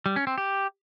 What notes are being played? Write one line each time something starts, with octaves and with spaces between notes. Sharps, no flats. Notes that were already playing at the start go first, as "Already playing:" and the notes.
G3
C#4
C4
G4